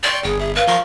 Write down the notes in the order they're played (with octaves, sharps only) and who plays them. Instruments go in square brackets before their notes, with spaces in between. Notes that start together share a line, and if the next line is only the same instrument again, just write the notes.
[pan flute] D5 [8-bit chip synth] G5 C6 C#6
[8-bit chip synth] G1 [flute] G#4 [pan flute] G5
[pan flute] G#4 [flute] E5
[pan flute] B4 [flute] F5
[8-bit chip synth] F3 A#4 C7 [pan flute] C#6